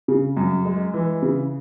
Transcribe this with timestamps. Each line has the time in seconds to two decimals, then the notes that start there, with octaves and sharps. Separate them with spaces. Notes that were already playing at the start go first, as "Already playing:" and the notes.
0.08 C#3
0.37 F#2
0.65 G#3
0.94 E3
1.22 C#3